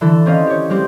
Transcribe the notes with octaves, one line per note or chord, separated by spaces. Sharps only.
D3 E3 A4
C4 C#4 D#5 F5
G4 C#5
G3 G#3 C4 G4